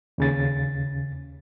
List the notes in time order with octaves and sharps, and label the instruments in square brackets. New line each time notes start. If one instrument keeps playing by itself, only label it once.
[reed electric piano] D#2 C#3 A6